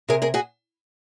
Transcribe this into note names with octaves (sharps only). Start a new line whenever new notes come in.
C3 G#4 A#4
G#4 A#4
F#4 G#4